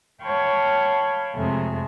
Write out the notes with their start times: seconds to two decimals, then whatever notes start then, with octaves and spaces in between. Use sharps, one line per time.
0.22 C#5 F5 G5 A5 B5 C#6
1.35 F2 C3 G#3 A3 G#4